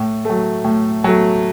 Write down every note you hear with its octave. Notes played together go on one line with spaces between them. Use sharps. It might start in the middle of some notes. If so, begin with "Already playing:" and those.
Already playing: A2
F#3 A3
A2
F#3 A3